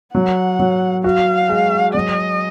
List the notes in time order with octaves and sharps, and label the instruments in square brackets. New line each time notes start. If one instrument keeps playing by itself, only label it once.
[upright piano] F#3 [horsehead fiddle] F#5
[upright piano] F#3
[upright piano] F#4 [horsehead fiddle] F5
[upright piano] G#3
[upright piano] F#3 [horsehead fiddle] D#5